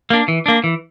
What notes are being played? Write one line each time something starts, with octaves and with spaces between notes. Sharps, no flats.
A#3 D4
E3
A#3 D4
E3